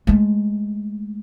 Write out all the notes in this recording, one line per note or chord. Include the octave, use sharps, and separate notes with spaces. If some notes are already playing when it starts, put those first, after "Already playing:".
G#3 A3